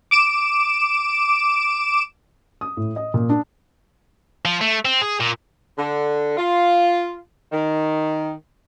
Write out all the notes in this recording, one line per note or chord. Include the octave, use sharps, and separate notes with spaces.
D6 D7 E7
D#6
A2
D#5
A#2
D4
F3
A3
C4
G#4
A#2
D3
F4
D#3